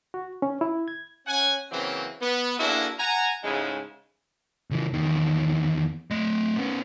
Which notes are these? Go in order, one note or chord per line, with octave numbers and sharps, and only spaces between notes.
F#4
C#4
E4
G#6
C#4 F#5 G#5
C#3 E3 F#3 A#3 C4
B3
A#3 D4 E4 F#4 G#4 A4
F#5 G#5 A#5
G#2 C#3 G#3 A3 E4
C#3 E3
E2 D#3
A3 D#5
B3 C#4